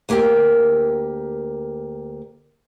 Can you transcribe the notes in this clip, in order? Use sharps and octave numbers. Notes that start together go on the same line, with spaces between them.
D2 A#3 G4 A#4 G5